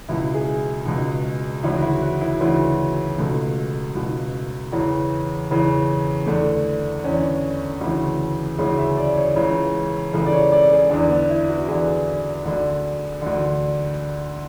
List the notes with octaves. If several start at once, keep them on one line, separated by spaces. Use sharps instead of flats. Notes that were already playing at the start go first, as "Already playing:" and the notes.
C#2 B2 E4
G#4
C#2 B2
D2 C#3 E3 E4
F#4
E4
F#4
E4
D2 C#3 E3
C#2 B2 A3
C#2 B2
E2 C#3 E3
E2 C#3 E3
E2 D3 A3
E2 D3 C#4
D2 C#3 E3
D2 C#3 E3 G#4
E5
D5
C#5
C#2 C#3 E3
C#2 C#3 E3 A4
D5
C#5
D5
G#4
E2 D3 D4
B3
E4
F#4
E2 D3 G#4
D2 D3
D2 D3